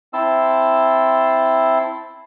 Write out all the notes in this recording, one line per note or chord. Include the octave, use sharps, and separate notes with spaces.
C4 E4 A5 C6 E6